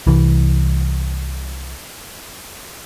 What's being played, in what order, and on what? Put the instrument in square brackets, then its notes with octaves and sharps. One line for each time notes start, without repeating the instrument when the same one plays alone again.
[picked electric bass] C2 E3